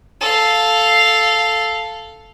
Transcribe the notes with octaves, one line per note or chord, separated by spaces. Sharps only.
A4 F5